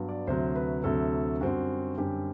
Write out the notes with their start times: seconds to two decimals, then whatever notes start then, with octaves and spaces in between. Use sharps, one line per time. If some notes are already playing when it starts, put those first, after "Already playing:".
Already playing: G2 F#3 B3
0.09 D5
0.27 D2 C3 F#3 C5
0.56 B4
0.84 D2 C3 F#3 A4
1.41 F#2 D3 G3 C4 F#4
1.97 F#2 D3 G3 C4 G4